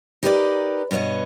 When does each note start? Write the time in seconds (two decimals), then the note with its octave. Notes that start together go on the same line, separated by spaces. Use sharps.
0.23 D#4 G4 A#4 B4 C#5 D5
0.91 G2 B2 B3 C#5 D#5